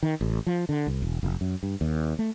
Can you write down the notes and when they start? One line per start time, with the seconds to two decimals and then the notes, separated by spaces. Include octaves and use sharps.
0.03 D#3
0.21 A1
0.47 F3
0.69 D3
0.87 C2
1.02 E1
1.23 F1
1.41 F#2
1.63 G2
1.81 D#2
2.19 A3